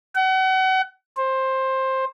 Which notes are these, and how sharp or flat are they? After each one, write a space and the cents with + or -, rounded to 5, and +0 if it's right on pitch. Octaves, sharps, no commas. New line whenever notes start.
F#5 +35
C5 +15